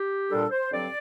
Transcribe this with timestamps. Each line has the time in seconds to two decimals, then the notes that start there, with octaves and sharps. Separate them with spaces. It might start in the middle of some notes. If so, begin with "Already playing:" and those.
Already playing: G4
0.30 A#2 G3 D4 A4
0.51 C5
0.72 G2 D3 F#3 C4 D5